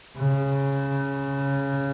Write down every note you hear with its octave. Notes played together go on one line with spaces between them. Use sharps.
C#3